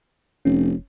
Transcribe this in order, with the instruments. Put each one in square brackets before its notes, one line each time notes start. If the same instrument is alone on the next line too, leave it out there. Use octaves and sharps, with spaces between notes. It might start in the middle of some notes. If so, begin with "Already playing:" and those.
[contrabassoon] F1 [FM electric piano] C#4